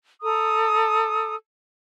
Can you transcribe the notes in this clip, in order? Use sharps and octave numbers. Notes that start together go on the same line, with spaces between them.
A4 A#5 D#6